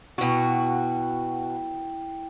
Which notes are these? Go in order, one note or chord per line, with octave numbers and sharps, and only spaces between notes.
B2 E4 F#4 G5